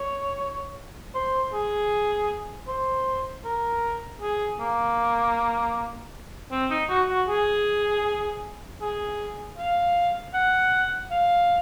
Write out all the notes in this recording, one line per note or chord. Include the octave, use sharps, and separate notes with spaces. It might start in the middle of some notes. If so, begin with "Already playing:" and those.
Already playing: C#5
C5
G#4
C5
A#4
G#4
A#3
C4
D#4
F#4
F#4
G#4
G#4
F5
F#5
F5